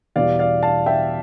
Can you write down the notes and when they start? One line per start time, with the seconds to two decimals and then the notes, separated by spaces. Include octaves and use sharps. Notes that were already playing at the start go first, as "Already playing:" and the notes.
0.16 E2 B2 G3 D5 F5
0.39 D5 F5
0.63 F5 A5
0.86 E5 G5